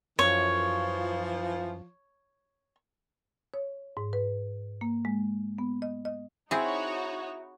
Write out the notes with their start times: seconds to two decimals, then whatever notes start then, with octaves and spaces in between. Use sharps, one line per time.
0.19 F#2 E3 F3 C#5
3.54 C#5
3.97 G#2
4.13 B4
4.81 A#3
5.05 G#3
5.58 B3
5.82 D#5
6.05 D#5
6.51 C4 D#4 E4 F#4 G#4 C#5